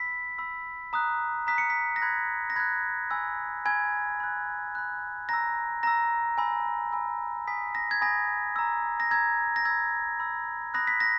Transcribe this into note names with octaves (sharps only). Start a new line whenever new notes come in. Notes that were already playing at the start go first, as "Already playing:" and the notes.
Already playing: B5 E6 B6
B5 E6
A#5 D#6 F#6
A#5 D#6 F#6 B6
C#7
B6
A#6
B5 F#6 G#6
A#6
B5 F#6 G#6
G#5 B5 E6
G#5 B5 E6 G#6
B5 F#6
B5 F#6
A#5 E6 A#6
A#5 E6 A#6
G#5 B5 E6
G#5 B5 E6
G#5 B5 D#6 B6
A#6
G#6
G#5 B5 D#6 A#6
A#5 E6
A#6
A#5 E6 G#6
A#6
B5 E6 G#6
B5 E6
B5 D#6 F#6 A#6
B6
A#6